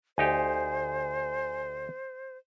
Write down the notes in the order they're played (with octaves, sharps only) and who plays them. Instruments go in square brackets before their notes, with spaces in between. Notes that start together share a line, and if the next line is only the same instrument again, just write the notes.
[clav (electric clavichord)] D2 D#4 G4 [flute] C5 [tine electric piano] G#5